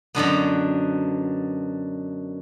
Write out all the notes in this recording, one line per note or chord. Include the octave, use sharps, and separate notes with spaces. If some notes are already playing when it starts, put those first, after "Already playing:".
F#2 B2 D3 B3